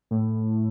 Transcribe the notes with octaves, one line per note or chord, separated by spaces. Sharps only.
A2